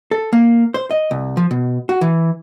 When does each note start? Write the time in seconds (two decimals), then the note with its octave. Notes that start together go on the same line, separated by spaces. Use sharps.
0.11 A4
0.33 A#3
0.74 C5
0.91 D#5
1.11 C2
1.37 F3
1.51 B2
1.89 F#4
2.01 E3